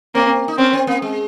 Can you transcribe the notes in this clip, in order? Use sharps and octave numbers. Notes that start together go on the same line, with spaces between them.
A#3 C4
D#4
C4 C#4
C4
A#3
G#3